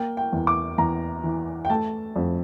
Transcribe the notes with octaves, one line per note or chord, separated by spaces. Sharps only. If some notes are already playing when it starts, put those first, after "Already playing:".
Already playing: A#3 G5
G5
E2
D6
E2 A#5
E3
G5
A3 A5
F2